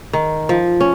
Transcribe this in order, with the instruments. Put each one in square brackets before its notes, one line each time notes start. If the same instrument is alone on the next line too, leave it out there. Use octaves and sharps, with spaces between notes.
[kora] D#3
F3
C#4